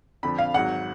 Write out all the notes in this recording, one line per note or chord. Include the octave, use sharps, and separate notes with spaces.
F2 D3 F3 B5
F5
G#1 G#2 F#3 F#5